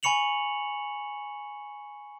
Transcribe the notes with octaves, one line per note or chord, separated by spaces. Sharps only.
G#5 B5 C#6 C#7 F7 F#7